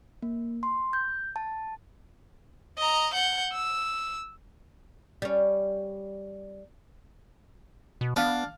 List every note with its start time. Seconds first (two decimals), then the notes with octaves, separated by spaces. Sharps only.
0.22 A#3
0.63 C6
0.93 G6
1.36 A5
2.78 D#5 A#5
3.14 F#5 G6
3.52 E6
5.22 G3 C#4
8.01 B2
8.16 B3 D4 F5 F6